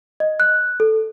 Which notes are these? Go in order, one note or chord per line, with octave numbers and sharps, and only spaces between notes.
D#5
F#6
A4